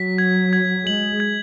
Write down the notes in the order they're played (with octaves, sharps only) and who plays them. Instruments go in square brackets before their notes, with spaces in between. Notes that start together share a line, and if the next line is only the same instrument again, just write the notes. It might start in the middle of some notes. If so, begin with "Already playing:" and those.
Already playing: [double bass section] F#3 [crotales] B6
[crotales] G#6
G#6
[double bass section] G#3 [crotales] F#7
[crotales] G#6